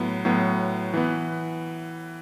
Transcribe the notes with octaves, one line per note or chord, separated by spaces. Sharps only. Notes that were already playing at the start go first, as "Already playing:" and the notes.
Already playing: A2 F#3 B3
A2 F#3 B3
E3 B3